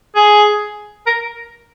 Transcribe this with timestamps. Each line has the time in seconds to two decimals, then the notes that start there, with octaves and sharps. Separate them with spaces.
0.16 G#4
1.07 A#4